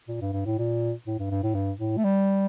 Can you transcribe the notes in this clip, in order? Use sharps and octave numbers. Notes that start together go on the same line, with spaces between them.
A#2
G2
G2
A2
A#2
A2
G2
G2
A2
G2
A2
A3
G3